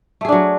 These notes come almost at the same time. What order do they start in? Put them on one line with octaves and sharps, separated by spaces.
A3 G#4 D4 F#3